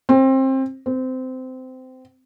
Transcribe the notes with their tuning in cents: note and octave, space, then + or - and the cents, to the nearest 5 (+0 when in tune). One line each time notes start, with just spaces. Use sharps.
C4 +25
C4 -20